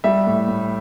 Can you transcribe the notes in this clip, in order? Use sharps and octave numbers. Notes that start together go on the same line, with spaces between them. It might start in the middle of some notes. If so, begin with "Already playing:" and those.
G3 E5
A2
A2